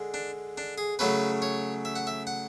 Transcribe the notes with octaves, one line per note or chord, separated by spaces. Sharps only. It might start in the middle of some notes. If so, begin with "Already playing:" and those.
Already playing: D3 G#3
D4
D4
G#4
C#3 F#3 A3 C#4 B4
C#5
E5
F#5
E5
F#5